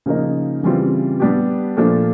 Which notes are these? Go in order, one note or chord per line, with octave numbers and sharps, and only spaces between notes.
C#3 F3 A#3 D#4
C#3 E3 G3 C4 F4
G3 B3 D4 G4
A#2 F3 A3 D4